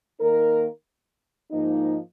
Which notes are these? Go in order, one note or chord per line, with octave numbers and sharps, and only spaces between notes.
D#3 A#3 D#4 A#4
G#2 F3 A#3 D#4